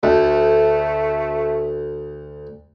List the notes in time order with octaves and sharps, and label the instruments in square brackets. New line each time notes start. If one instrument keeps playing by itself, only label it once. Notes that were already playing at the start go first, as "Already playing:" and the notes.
[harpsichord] D2 [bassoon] A3